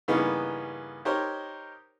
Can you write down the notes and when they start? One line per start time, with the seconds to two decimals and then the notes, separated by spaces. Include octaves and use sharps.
0.08 G2 C#3 E3 A#3 B3 D#4
1.05 D#4 G4 A#4 C5 C#5